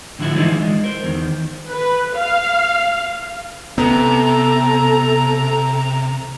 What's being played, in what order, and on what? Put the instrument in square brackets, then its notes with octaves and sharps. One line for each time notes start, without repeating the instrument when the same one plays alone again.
[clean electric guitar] A2 D3 F3 A3 E4 F#4
E3 F3 G#3 D4 D#4 F4
G#3
A#4 C5
E2 D#3
[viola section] B4
F5
[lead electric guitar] C3 [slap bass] B3 [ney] A4 [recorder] A#5